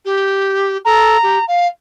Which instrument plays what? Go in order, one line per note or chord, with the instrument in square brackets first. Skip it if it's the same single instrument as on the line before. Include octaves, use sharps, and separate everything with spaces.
[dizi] G4
[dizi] A4 [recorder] A#5
[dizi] G4
F5